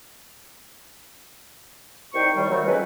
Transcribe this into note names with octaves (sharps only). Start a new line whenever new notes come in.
C2 D#3 D#4 C5 G5 C#6
A2 C3 D#3 G3
F#3 A3
F2 G#3 C#4 B4